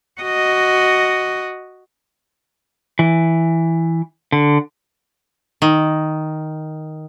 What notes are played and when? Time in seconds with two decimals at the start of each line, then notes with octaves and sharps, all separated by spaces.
0.21 F#4 D#5
2.99 E3
4.32 D3
5.62 D#3